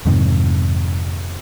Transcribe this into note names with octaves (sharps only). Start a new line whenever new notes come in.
F2 G#2 C3 D#3